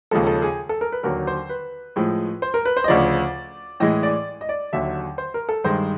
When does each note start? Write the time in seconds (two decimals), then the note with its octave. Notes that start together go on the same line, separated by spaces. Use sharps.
0.11 D#2 C#3 F3 G#3 A4
0.27 A4
0.42 G#4
0.69 A4
0.81 A#4
0.92 B4
1.03 D#2 D3 F#3 A#4
1.27 C5
1.49 B4
1.96 A2 F3 G#3
2.42 C5
2.54 A#4
2.65 B4
2.77 C5
2.84 D#5
2.88 D2 C#3 F3 D5
3.80 A2 E3 G#3 D#5
4.03 D5
4.41 D#5
4.49 D5
4.73 D#2 D3 F#3 E5
5.18 C5
5.34 A#4
5.49 A4
5.64 G2 D#3 G#3 C5